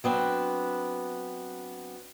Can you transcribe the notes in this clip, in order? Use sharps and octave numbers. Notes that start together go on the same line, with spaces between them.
F#3 B3 C4 D4